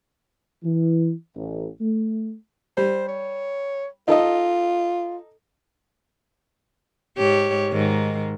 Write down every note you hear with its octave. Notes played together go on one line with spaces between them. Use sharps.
E3
A1
A3
G3 C5
C#5
D#4 F4 A4 D#5
G#2 G4 C#5
G#2 D#3